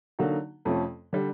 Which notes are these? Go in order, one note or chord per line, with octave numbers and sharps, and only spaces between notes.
D3 F#3 A#3 D#4 F#4
F2 C3 F3 A3 C#4
D3 G3